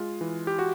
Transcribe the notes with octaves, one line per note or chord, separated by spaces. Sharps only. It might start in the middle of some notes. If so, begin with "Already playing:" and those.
Already playing: G#3 F4
E3
G4
F#4